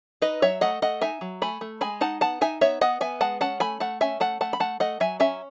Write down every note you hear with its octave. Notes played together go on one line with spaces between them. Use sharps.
D#4 B4 D#5
F#3 C#5 E5
A3 D#5 F#5
A3 D#5 F#5
D#4 E5 G#5
F#3
A3 G#5 B5
A3
G#3 G#5 B5
D#4 F#5 A5
B3 F#5 A5
D#4 E5 G#5
B3 C#5 E5
B3 D#5 F#5
B3 E5 G#5
G#3 F#5 A5
C#4 F#5 A5
A3 G#5 B5
A3 F#5 A5
C#4 E5 G#5
A3 F#5 A5
A3 F#5 A5
B5
A3 F#5 A5
A3 D#5 F#5
F#3 E5 G#5
C#4 E5 G#5